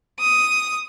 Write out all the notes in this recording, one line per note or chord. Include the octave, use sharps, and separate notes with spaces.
D#6